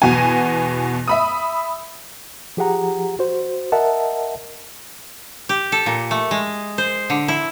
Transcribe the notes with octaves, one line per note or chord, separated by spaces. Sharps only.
E2 B2 F#4 G#5
E5 B5 D#6
F3 G4 G#4 F#5 A#5
F#4 C5
A#4 D#5 E5 F#5 A5
G4
A4
A#2
A3
G#3
C5
D3
E4